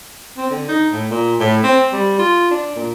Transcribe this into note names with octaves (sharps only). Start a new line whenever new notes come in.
C4
D3
D#4
A2
A#2
A2
C4
G3
F4
D4
A#2